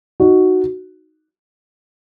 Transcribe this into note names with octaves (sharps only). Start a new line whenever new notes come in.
D#4 F#4